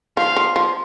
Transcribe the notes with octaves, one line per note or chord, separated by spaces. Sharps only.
F3 F5
F3
F3